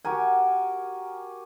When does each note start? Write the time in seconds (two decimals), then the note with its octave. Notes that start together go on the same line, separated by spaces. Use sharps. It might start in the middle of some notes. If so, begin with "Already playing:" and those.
0.05 F#4 G4 A#4 G#5